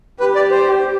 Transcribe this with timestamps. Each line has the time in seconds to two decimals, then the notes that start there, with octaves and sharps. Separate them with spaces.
0.20 G4 B4
0.35 D5
0.51 C5